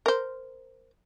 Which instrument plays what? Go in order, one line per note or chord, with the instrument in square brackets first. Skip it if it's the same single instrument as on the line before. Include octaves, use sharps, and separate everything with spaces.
[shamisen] A#4 C5